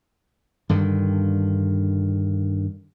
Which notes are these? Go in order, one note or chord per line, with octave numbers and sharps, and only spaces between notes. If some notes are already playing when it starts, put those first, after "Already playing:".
G2 D3 D#3